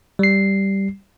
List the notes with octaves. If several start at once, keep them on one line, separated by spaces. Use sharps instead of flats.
G3 C7